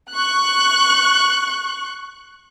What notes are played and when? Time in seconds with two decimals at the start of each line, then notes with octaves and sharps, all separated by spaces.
0.11 C#6 F#6